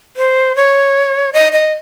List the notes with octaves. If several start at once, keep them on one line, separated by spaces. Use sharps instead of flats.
C5
C#5
D#5
D#5